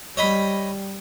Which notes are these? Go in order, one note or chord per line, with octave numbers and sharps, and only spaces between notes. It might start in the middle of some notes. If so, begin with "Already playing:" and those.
G3 C#5 D#5 B5